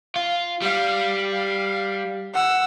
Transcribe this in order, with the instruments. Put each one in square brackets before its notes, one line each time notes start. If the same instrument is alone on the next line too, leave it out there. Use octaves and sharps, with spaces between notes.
[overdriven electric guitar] F4
[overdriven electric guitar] G3 [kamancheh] F5
[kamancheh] F5
F#5 E6